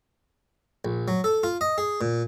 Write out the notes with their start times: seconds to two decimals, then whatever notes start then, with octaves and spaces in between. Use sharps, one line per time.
0.85 A#1
1.08 F#3
1.24 A4
1.43 F4
1.61 D#5
1.78 G#4
2.01 A#2